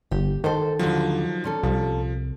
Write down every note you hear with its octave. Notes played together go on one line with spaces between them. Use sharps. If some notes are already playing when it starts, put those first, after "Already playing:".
G1 G4
D#3 A4 C5 G5
D#2 D3 F3 F#3
A#2 C#4 A4
C2 F3